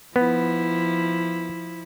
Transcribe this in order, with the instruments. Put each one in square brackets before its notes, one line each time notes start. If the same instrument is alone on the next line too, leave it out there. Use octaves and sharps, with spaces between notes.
[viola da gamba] F3 E4 [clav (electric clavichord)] B3